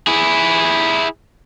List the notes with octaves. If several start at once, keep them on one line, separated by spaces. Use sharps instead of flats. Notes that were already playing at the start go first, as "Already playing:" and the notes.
E4 G#4